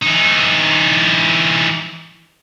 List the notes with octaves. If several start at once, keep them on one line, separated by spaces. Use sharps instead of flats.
E3 D#4